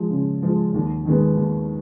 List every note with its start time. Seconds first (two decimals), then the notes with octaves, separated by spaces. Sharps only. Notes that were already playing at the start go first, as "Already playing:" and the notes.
Already playing: F3 G#3
0.10 C#3
0.42 F3 G#3
0.74 D#2
1.05 D#3 G#3 B3
1.37 D#2